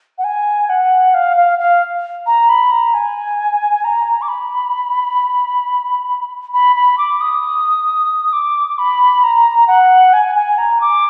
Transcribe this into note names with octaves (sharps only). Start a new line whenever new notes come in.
F#5
G#5
F#5
F5
F5
F5
A#5
B5
A#5
G#5
A#5
D6
B5
B5
B5
D6
D#6
D6
B5
A#5
F#5
G#5
G#5
A#5
D6